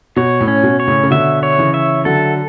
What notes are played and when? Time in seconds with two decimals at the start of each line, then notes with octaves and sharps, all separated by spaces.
0.16 B2 C#5
0.41 A2
0.48 C#4
0.63 B2
0.80 C#5
0.87 A2 C#3
1.03 C#3
1.11 B2 D3 E5
1.43 C#5
1.58 C#3 E3
1.74 E5
2.05 D3 F#3 A4